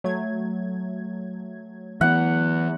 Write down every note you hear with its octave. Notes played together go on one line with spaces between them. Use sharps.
F#3 A3 G#6
E3 B3 F#5